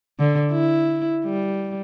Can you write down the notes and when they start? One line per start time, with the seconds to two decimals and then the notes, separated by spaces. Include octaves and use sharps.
0.19 D3
0.52 E4
1.25 G3